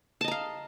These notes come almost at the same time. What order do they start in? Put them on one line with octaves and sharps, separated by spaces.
A5 D#5 A#5 F5